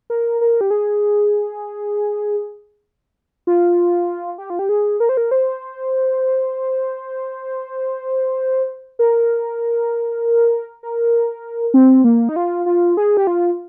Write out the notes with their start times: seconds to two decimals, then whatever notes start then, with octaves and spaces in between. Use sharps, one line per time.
0.10 A#4
0.41 A#4
0.61 G4
0.70 G#4
3.47 F4
4.38 G4
4.50 F4
4.59 G4
4.69 G#4
5.00 A#4
5.09 C5
5.17 A#4
5.31 C5
8.99 A#4
10.83 A#4
11.74 C4
12.04 A#3
12.29 D#4
12.36 F4
12.66 F4
12.97 G#4
13.17 G4
13.27 F4